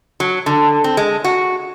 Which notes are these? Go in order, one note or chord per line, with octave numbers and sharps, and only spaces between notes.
F#3
D3
C4
G#3
F#4